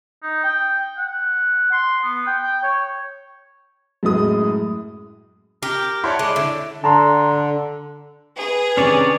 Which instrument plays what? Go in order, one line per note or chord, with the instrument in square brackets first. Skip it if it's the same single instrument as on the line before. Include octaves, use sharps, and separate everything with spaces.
[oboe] D#4
G5
F#5
C6
B3
G5
C#5
[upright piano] F#2 A2 G#3 D#6
[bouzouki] G4 [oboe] A#4
[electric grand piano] E4 C#5 D5 [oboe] F#5 [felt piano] A5 B5 C6
[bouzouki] G#3 [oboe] D6
[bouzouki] D3 [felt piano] E5
[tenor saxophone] D3 [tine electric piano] A5 A#5 C6
[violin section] G#4 [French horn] B4
[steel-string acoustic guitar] C3 D#3 D4 [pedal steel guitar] C#4 C#5 D5